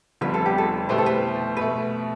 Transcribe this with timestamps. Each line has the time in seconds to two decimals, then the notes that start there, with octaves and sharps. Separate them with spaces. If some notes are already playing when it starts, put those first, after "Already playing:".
0.21 F1 F2 D3 G3 B3 B4
0.34 A4
0.46 G4
0.58 A4
0.89 B2 A3 E4 G4 B4 C5
0.98 A4
1.06 B4
1.57 B2 A3 B4